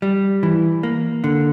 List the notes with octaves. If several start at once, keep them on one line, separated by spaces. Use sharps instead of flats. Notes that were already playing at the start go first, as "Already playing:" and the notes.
G3
E3
A#3
D3